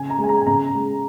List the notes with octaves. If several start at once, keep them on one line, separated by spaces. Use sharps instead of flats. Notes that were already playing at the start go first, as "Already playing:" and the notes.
Already playing: C#3 G#5
A#5
G#3
G#5
A#5
G#5
C#3 A#5
G#3